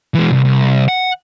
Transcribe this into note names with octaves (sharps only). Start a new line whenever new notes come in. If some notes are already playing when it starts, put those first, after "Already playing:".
E3 G#3
C2
C2
F#5